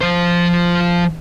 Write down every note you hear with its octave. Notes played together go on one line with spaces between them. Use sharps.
F3 C5